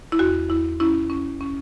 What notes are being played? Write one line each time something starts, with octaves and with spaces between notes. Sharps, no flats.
E4
E2 F#4
E2 E4
C#4 E4
C#4
C#4